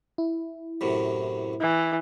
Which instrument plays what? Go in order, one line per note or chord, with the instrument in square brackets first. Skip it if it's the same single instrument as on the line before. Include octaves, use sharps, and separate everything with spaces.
[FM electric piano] E4
[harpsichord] F#2 A2 C3
[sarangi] E3